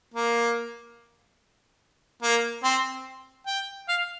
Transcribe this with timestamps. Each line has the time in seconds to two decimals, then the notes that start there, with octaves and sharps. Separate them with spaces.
0.14 A#3
2.23 A#3
2.64 C4
3.47 G5
3.89 F5